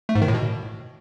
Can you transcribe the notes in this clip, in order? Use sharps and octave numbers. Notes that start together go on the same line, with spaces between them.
A3
G#2
D#3
A2
B2